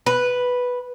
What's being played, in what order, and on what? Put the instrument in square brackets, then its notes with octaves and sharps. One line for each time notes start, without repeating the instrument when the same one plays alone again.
[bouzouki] B4